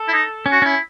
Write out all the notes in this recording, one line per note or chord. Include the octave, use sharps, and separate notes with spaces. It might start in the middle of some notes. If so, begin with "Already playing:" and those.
Already playing: A4
E4
D#4
C#4
F#4
C#4 E4